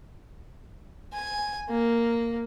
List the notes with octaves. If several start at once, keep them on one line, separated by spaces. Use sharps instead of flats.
G#5
A#3